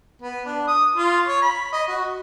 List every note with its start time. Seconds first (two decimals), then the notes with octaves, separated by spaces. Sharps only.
0.22 B3
0.46 D4
0.68 D#6
0.96 F4
1.26 C#5
1.42 B5
1.72 D#5
1.88 F#4